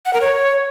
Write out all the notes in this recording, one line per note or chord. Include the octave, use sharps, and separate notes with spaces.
F#5
A#4
C#5